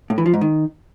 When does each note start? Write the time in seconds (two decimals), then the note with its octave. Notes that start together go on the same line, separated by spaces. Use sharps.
0.10 A2
0.18 E3
0.26 F3
0.34 G#2
0.41 D#3